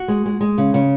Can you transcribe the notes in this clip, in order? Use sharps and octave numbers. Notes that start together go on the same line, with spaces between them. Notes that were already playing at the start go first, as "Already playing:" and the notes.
Already playing: F#4
G#3
G#3
G#3
C#3
C#3